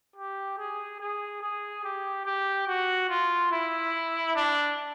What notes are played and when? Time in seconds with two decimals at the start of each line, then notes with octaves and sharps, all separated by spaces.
0.16 G4
0.58 G#4
1.00 G#4
1.42 G#4
1.84 G4
2.25 G4
2.68 F#4
3.09 F4
3.51 E4
4.35 D4